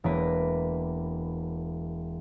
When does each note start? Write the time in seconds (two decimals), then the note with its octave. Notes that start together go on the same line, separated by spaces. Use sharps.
0.04 E1 A#3 A#4 B4 B5